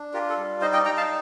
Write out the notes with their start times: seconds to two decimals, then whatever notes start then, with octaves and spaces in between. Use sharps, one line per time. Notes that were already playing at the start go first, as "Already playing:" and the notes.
Already playing: D4
0.14 F4 G4 A#4
0.29 A4
0.37 G3
0.61 D#4 C5 D#5
0.73 D#5 G5
0.85 D#4 G5 A#5
0.97 F5 A5